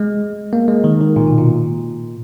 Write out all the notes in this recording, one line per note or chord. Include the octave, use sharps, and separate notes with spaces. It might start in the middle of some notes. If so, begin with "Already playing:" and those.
Already playing: G#3
A#3
G#3
D#3
D#3
A#2
B2
A#2